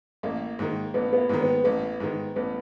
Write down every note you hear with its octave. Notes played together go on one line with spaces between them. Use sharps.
A1 A#3
G#2 D#3
A1 B3
B3
A#3
G#2 D#3
B3
A1 B3
G#2 D#3
A1 B3